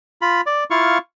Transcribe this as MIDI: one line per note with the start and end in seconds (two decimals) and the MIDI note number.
0.22 0.41 65
0.22 0.41 83
0.46 0.64 74
0.70 0.98 64
0.70 0.98 65
0.70 0.98 77
0.70 0.98 85